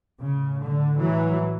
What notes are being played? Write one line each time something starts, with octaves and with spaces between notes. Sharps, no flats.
A2 C#3
D3
A2 E3 F#3